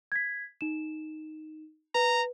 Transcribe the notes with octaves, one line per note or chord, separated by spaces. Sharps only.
G#6 B6
D#4 E7
B4 A#5